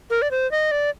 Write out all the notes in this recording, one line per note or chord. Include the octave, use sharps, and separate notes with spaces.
A#4
D5
C5
D#5
D5